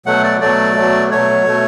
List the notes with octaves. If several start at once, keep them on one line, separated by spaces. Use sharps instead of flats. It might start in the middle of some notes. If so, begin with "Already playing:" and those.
B2 F#3 A3 F#5
D5
B2 F#3 A3 D5
B2 F#3 A3
B2 F#3 A3 C#5
B2 A3